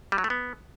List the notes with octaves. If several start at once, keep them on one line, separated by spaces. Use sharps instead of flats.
G3
F#3
A3
B3